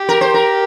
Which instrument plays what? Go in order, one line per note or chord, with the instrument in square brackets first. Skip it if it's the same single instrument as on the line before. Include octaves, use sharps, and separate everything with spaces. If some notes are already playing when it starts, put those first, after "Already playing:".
Already playing: [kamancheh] G4
[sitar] A#4
C5
A#4